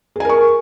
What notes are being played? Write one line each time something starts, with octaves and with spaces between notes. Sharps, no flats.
G#4 A#4 G#5 C#6